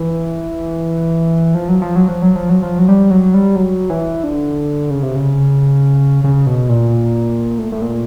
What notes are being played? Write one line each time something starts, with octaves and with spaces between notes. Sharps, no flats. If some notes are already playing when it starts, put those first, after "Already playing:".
Already playing: E3
F3
F#3
F3
F#3
F3
F#3
F3
F#3
F3
F#3
G3
F#3
G3
F#3
E3
D3
C#3
C3
C#3
C#3
B2
A#2
A2
A2
A#2